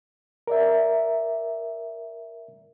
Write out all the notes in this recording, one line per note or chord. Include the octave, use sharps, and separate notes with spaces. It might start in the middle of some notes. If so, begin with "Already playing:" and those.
A#4 D5 E5